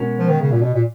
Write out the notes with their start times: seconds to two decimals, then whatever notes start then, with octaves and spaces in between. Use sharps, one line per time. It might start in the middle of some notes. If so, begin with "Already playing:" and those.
Already playing: B2 G#3 C#4 F#4 A#4
0.19 F3
0.29 D#3
0.41 C#3
0.52 A#2
0.62 B2
0.74 A#2